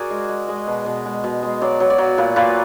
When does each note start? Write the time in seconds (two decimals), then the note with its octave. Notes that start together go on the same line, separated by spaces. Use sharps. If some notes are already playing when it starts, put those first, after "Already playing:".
Already playing: F#4 G#4 A#4 D5
0.10 G#3
0.29 G#3
0.48 G#3 D#5
0.67 B2
0.86 B2
1.05 G#3
1.24 B2
1.43 G#3
1.61 F#3 D5
1.80 F#3
1.90 D5
1.98 F#3
2.18 A#2 B4
2.36 A#2 B4